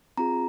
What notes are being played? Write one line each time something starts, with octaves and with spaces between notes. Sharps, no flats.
C4 F4 G#4 A#5